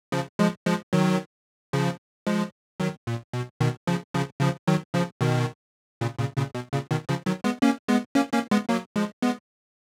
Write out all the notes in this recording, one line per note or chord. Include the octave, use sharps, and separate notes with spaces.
C#3 F3
F3 G#3
F3 G#3
D#3 F#3
C#3 F3
F3 G#3
D#3 F#3
A#2
B2
B2 D#3
C#3 F3
C#3 F3
C#3 F3
D#3 F#3
C#3 F3
B2 D#3
A#2 C#3
A#2 C#3
A#2 C#3
B2
A#2 C#3
B2 D#3
C#3 F3
D#3 F#3
G#3 B3
A#3 C#4
G#3 B3
A#3 C#4
A#3 C#4
G#3 B3
F#3 A#3
F3 G#3
G#3 B3